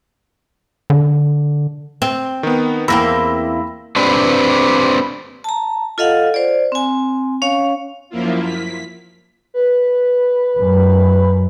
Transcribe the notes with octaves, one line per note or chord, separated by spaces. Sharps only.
D3
C4
D#3 B3
E2 A#3 C4 B5 E6 A#6
C4 D4 G4 B4
A5 A#5
F4 A4 D#5 F5 F#5
C5 D5
C4 G#5
C#4 C#5 F5
F#2 F3 A#3 E4 F4
B6
B4
F#2